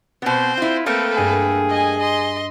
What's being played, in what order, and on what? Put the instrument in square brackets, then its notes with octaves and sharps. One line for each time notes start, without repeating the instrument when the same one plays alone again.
[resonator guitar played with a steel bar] B2 B3 [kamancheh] C4 C5
[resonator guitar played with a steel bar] E4 F4
[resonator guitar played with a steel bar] A3 A#3 C4 [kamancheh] A4 B4
[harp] G2 [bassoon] G#4
[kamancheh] D#5 G#5
D#5 C6